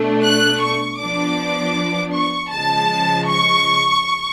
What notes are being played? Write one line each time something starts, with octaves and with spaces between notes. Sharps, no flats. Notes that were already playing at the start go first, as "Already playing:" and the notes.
Already playing: B2 A3 D4
F#6
C#6
F3 B3 D4 D6
C#6
C#3 F3 G#3 A5
C#6